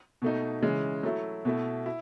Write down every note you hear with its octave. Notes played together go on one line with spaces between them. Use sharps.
B2 A3 D#4
C#3 E3 G#3
F#3 A3 E4
B2 A3 E4
E4